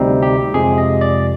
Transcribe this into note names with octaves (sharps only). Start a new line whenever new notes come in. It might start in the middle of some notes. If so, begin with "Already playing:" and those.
Already playing: D2 C3 G3 C4 D#4
G4
F2 C3 F3 G#3 G#4
D#5
D5